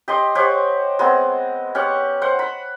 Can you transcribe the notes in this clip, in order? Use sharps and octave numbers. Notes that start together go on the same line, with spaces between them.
G4 D#5 C6
G4 C5 C#5 F#5
G#3 B3 C4
C#4 G4 F#5
C5 F#5
B5